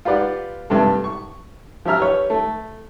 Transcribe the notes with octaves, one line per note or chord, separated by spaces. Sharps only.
F4 G4 B4 D5 F#5
G2 C3 A3
C#6
F3 G4 E5 A#5 F6
G4 B4 C#5
A3